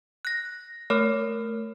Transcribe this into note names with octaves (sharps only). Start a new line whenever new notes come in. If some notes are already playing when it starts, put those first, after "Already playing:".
F#6 A#6
A3 A#4 C#5 F6